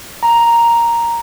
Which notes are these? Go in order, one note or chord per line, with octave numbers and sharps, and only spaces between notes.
A#5